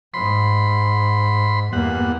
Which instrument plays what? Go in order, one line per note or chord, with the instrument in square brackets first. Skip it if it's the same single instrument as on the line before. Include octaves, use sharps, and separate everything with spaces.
[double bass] G#2 [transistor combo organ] B5 C6
[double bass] E2 A#3 [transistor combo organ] G2 F#5